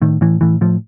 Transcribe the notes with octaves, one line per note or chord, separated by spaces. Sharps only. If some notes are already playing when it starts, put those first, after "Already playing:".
A2 D#3
A2 E3
A2 E3
A2 F3